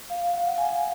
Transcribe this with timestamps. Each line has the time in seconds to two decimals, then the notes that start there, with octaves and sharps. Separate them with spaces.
0.10 F5
0.33 F#5
0.46 F#5
0.58 G#5